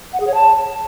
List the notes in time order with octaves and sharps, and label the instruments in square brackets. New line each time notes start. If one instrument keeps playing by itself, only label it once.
[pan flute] F#5
G#4
C#5
A5